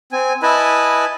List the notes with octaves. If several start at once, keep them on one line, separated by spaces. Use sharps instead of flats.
C4 G#5
E4 B4 D#5 G#5 A5 B5